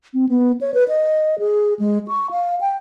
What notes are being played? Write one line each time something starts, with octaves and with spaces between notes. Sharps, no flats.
C4
B3
C#5
B4
D#5
G#4
G#3
C#6
F5
G5